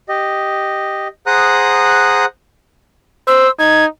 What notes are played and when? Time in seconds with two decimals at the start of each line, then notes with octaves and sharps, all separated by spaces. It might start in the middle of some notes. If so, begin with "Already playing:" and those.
0.09 G4 D#5
1.26 G#4 C5 F#5 A#5 D#6 F#6
3.27 C5 E6
3.59 D#4 G#6